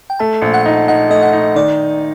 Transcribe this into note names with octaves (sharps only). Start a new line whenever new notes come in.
G5
A3 A5
A#1
F#5
D#4
D#4 F#5
A3 D#5
F#5
D#4
D#3 D5